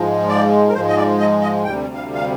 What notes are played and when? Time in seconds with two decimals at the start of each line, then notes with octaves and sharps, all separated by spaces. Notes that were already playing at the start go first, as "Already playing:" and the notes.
Already playing: G#2 F3 G#3
0.29 D5
0.69 A#4
0.73 G#2 F3 G#3 C5
0.89 D#5
0.96 D5
1.19 D#5
1.41 D#5
1.64 D2 C3 G3 G5
1.95 F5
2.14 F5